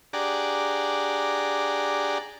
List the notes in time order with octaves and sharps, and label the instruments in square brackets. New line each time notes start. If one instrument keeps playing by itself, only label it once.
[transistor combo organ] D4 G4 G#4 D5 F#5 A#5